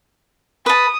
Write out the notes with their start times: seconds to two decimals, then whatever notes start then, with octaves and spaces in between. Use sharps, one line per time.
0.66 B4 A5 D#6